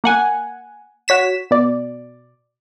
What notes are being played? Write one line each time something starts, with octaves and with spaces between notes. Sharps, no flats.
A#3 F#5 G#5
F#4 C#5 B6 E7
B2 D5